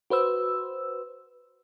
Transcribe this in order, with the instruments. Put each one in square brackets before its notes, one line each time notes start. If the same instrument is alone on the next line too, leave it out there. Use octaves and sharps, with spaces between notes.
[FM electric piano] F#4 B4 C5 E6